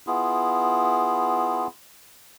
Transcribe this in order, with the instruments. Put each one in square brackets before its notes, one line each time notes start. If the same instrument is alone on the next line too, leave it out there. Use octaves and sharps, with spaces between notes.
[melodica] B3 E4 F4 G#4